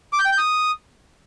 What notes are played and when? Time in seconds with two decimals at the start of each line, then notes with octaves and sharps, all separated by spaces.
0.13 D6
0.19 G6
0.25 G5
0.32 G6
0.38 D#6